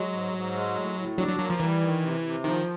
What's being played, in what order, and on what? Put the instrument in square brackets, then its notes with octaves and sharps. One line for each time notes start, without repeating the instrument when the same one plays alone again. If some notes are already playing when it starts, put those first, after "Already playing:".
Already playing: [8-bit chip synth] F#3 [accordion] G#3
[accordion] G#2
G#2
G#3
A2
A2
[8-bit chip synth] F#3 [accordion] D4
[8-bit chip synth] F#3
[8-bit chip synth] F#3 [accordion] A#3
[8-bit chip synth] F3
[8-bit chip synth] E3 [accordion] G3
[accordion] D#3
C3
C3
[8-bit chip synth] D#3 [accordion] F3